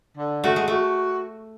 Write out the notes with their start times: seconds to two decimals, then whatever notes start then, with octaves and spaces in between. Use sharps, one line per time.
0.17 D3
0.43 A3 F#4
0.56 G#3
0.68 A3 F#4